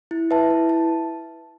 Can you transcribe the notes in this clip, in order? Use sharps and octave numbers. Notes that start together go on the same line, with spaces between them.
E4
B4 E5 A5
E4
A5